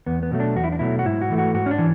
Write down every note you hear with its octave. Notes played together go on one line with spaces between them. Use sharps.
E2 B3
B3
B2 F#3 A3
D4
E2 F#4
E4
D4
B2 F#3 A3 E4
F#4
G#2 E4
F#4
E3 A3
F#4
G#2 F#4
C#4
D4
E3